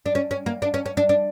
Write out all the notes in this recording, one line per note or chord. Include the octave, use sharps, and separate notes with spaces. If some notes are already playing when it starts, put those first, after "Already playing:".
D4
C#4
C#4
A#3
D4
C#4
C#4
D4
D4